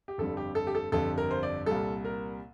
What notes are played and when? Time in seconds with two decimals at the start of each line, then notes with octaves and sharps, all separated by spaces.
0.08 G4
0.18 G1 F2 D3 G3 A4
0.37 G4
0.55 A4
0.67 G4
0.75 A4
0.92 G1 F2 D3 G3 A4
1.18 A#4
1.31 C5
1.43 D5
1.66 C2 A#2 G3 A4
2.05 A#4